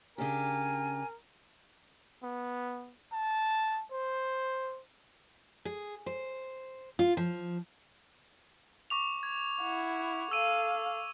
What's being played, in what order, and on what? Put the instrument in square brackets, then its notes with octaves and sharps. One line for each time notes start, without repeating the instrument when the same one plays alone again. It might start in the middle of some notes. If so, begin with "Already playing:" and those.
[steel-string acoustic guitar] C#3 D4 G4 [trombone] A#4 [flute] G#5
[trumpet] B3
A5
C5
[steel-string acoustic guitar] G#4
C5
F4
F3
[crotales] C#6 D6 F7
G#6
[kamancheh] E4 F#5
[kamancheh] A4 F5 [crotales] E6 D#7